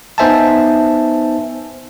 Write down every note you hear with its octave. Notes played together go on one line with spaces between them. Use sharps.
B3 D#4 C5 E5 G#5 A5